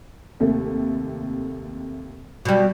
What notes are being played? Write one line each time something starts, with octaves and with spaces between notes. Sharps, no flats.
D#2 C3 A3
B2 G3